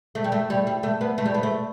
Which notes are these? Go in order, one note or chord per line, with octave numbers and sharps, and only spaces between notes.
A3
G3
A3
G3
G3
A3
B3
A3
G3
B3
A3